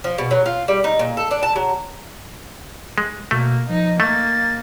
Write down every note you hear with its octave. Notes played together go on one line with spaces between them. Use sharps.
F3
B2
F#3
F4
G3
D#4
A#2
A4
D4
A5
F#3
G#3
B2 A3 A#3
F3 D#4
A3 A#3 A6